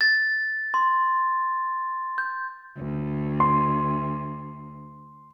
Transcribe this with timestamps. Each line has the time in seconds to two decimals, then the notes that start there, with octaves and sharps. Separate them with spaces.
0.01 A6
0.74 C6
2.18 G6
2.77 D2
3.40 C6